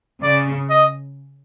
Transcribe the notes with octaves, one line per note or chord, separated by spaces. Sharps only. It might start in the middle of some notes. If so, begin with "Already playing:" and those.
C#3 D5
D#5